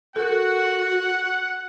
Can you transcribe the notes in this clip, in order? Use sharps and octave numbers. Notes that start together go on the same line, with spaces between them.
F#4 A4 A#4 F#5